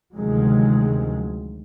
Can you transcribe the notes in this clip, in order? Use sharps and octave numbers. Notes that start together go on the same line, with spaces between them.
D2 C3 D#3 F3 F#3 G#3